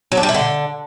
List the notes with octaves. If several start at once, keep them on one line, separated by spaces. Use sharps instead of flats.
F#3
D4
G3
E4
D3